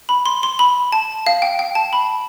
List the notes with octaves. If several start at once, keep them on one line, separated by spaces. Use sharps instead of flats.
B5
C6
C6
B5
A5
F5
G5
G5
A5
B5